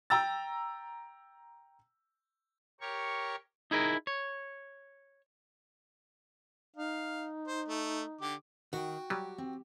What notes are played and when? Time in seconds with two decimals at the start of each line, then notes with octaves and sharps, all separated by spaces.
0.10 G5 A#5 E6 A6
2.81 G4 A#4 C#5 C#6
3.71 D#4 E4 G#4 A#4
4.07 C#5
6.76 D#4 F5
7.48 C5
7.68 A3
8.21 D3 G4 D6
8.73 D#3 F#4 F#5 G5
9.10 F#3 G3 G4
9.38 C4